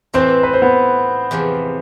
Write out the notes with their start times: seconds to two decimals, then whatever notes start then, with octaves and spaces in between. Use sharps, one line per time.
0.14 A2 E3 A3 C4 E4 C5
0.43 B4
0.53 C5
0.62 B3 B4
1.31 E2 C3 F3 C4